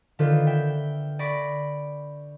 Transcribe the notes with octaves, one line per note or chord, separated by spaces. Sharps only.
D3 D#3 F4 A4 B4 C5
E5 G5
D5 B5 C#6 A#6 B6 D7